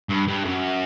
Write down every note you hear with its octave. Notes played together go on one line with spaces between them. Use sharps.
G2
G2
F#2